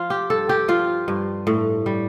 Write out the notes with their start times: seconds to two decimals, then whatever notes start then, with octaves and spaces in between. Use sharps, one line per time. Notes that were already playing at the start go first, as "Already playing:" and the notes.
Already playing: F3 F4
0.10 G4
0.30 G2 A4
0.49 G4
0.68 F3 F4
1.08 G2
1.47 A2
1.86 G3